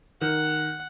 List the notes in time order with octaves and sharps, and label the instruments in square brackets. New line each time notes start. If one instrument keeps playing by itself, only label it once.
[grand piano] D#3 [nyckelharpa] F#5